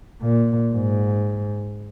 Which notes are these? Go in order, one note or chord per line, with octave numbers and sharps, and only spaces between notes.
A#2
G#2